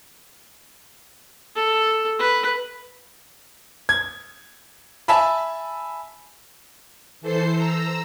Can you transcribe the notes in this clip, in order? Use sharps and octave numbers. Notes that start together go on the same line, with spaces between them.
A4
B4
G#6
E5 G#5 A5 B5
E3 A4 C5 C7
A#5 E6